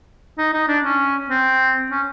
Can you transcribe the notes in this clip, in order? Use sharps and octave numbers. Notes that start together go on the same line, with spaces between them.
D#4
D#4
D4
C#4
C4
C#4